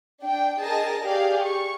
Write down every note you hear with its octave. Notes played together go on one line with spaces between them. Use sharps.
D4 G5
G#4 A#4 D#5 A5 A#6
G4 G#4 D5 F5
C#6